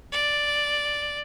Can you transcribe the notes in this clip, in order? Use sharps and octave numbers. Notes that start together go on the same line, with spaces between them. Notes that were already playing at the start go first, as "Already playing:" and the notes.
D5